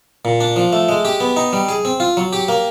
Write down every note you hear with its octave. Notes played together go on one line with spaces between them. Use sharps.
A#2
D4
F3
A3
G#3
G4
B3
D#4
G3
G#4
C4
F4
F#3
G4
A#3